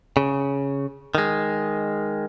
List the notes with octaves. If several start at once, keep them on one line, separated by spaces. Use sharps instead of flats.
C#3
D#3 G#3